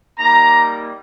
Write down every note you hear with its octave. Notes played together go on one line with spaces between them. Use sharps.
G3 A#3 D#4 A#5